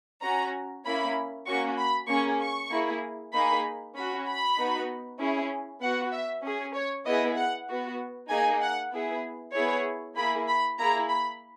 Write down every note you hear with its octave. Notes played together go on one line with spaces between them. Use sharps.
C#4 F#4 A#5
A#3 C#4 E4 B5
A#3 C#4 F#4 C#6
B5
A#3 C#4 G#4 C#6
C#6
A#3 E4 G#4
A#3 D#4 G#4 B5
C#4 F#4 B5
B5
B3 D#4 F#4
C#4 E4 G#4
B3 F#4 F#5
E5
C#4 G#4
C#5
B3 E4 G#4 D#5
F#5
B3 F#4
A#3 D#4 G#4 G#5
F#5
B3 E4 G#4
B3 E4 G#4 C#5
A#3 E4 G#4 B5
B5
A#3 E4 G#4 A#5
B5